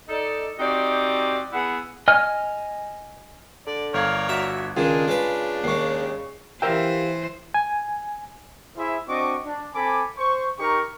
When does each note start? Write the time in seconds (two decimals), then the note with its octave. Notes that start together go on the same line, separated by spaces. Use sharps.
0.09 D#4 A4 D5
0.58 C4 D#4 F#4 G4 D5 D#5
1.53 B3 E4 G#4 F#5
2.08 D#5 G#5 F6
3.67 D3 D5
3.94 G1 A#4 C#5 D5 F5 G#6
4.29 F#4 E5
4.76 C#2 D#3 D4 F4 G#4
5.08 C#3 G#3 B4
5.64 D#2 G#3 C#6 C7
6.62 E3 G4 A#4 C5 E5 F5 G5
7.54 G#5
8.78 E4 G#4 C5 E5
9.08 C4 D4 F#4 D#5 C#6 D6
9.45 D4
9.75 C4 A4 G#5 B5 D6
10.18 C5 C#6
10.59 D#4 G4 A#4 C#6